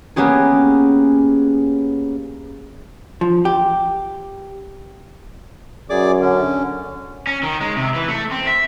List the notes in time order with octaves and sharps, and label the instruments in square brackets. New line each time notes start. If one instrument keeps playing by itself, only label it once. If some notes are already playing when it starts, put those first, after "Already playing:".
[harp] A#3 B3 C#4 G4 G#4
[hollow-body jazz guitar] F3
G4
[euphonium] F#2 [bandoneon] G#4 D5 D6
[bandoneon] D3 C#4
[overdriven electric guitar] C#4
D#3
G#3
C3
E3
A3
C4
E5